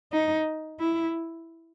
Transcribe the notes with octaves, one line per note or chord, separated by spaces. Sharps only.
D#4
E4